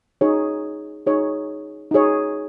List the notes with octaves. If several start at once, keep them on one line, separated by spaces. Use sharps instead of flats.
D#4 G#4 C#5
D#4 G#4 C#5
D#4 G#4 C#5